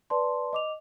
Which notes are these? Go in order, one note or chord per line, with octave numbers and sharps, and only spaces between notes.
B4 D5 A5 C6
D#5 D6 F7